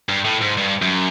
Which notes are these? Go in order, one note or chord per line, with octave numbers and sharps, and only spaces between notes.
G2
A2
G#2
G2
F#2